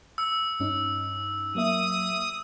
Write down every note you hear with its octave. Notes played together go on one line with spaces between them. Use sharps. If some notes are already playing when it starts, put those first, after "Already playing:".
E6
G2 C#4 D#4
F#3 A#3 E5 D#6